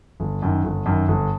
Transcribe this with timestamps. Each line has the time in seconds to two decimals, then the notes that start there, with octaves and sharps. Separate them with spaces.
0.20 G1
0.42 F#2 D#3
0.64 G1
0.86 F#2 D#3
1.08 G1